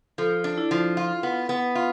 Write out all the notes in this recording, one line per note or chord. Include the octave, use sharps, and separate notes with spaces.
F3 A4
D4
E4
F3
F4
B3
B3
F4